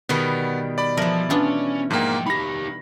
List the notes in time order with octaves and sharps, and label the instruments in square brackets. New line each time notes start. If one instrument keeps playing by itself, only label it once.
[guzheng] B2 D#3 G3 [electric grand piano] B3
[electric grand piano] D5 B5
[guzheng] E3 E4 [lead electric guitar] F3 [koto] A#4
[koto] B3 D4 F4 [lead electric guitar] C#4
[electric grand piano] G#2 A#3 [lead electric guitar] F3 G5
[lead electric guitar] D#4 G4 [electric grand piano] B5 A#6